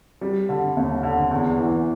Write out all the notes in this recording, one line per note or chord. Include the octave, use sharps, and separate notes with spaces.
G3
D3
D#2
D3
E2
E3